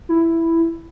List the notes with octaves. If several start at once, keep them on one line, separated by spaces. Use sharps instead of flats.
E4